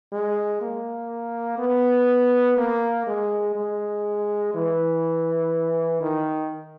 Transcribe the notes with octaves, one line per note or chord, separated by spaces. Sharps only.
G#3
A#3
B3
A#3
G#3
G#3
E3
D#3